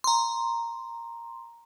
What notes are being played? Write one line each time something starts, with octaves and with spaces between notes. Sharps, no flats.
A#5 C6